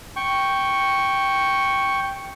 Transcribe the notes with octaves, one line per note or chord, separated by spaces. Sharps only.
G5 C#6